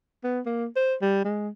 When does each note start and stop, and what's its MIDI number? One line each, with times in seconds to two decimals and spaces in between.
0.24 0.40 59
0.46 0.67 58
0.76 0.94 72
1.02 1.21 55
1.25 1.49 56